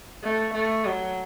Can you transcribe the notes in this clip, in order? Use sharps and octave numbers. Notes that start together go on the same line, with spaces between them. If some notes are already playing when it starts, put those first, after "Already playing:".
A3
A3
F#3